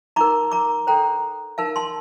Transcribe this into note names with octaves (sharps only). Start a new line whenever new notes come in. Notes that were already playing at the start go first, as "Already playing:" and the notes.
D#4 A#4 A#5 D6
A#5 D6
D4 A4 C5 G5 A#5
D#4 A#4 F5 A5
A5 C6